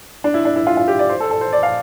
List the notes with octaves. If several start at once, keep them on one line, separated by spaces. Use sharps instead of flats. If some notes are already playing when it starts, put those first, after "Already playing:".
D4
E4
D4
E4
F4
F4
G4
D5
C5
A4
A4
C5
D5
F5